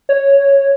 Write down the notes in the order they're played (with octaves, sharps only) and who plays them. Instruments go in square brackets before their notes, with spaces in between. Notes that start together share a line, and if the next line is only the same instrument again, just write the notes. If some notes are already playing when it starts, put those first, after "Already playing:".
[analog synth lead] C#5